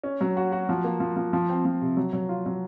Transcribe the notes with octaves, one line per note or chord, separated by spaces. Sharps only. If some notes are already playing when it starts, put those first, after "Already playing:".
C#4
F#3
F#4
F#4
F3
A#3
F3
F3
F3
C4
F3
C3
F#3
F#3
F4
F#3